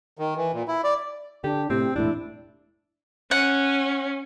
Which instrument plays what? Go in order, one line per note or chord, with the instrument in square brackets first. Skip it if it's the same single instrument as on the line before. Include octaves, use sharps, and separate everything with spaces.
[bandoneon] D#3
E3
A#2
E4
D5
[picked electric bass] D3 [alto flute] D4 [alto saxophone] G4
[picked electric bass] A2 C3 [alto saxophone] C4 [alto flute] G4
[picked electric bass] E1 A2 [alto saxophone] D4 [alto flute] E4
[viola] C#4 [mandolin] F#5